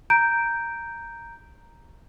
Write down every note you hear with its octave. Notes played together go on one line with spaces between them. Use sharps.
A#5 G6 D7